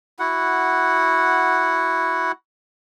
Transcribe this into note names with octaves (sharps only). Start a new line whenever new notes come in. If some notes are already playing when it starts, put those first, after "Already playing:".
E4 F#4 F#5